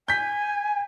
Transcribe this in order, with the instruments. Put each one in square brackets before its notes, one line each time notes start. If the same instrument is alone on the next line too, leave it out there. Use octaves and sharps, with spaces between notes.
[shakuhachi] G#5 [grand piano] G6 B6